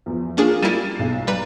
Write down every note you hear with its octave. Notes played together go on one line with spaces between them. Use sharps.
E2 F3
A#3 C#4 D4 F4 G#4
G3 A#3 E4 A6 D#7 E7
B1 C7
G3 B4 A#5 A6